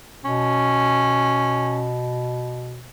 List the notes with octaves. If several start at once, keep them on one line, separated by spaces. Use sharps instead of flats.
B2 C#4